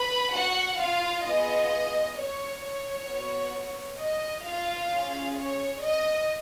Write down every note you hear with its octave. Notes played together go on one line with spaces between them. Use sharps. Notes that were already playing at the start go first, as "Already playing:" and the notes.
Already playing: B4 B5
F#4 F#5
F4 F5
B3 F4 G#4 D#5
C#5
C#5
B3 F#4
D#5
F4 F5
C#4 G#4
C#5
D#5